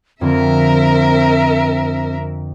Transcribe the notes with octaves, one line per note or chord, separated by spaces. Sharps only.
F2 D3 C4 A#4 E5